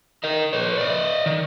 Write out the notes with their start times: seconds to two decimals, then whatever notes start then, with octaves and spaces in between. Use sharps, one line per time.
0.24 A#4 D#5
0.53 B4 C#5
0.78 D5 D#5
1.26 D#3